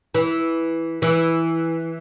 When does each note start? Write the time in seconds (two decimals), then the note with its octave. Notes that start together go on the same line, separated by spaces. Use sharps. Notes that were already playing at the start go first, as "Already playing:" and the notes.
0.14 E3
1.02 E3